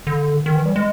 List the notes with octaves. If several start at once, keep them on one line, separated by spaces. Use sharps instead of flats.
D3
D#3
E3
G3
G#3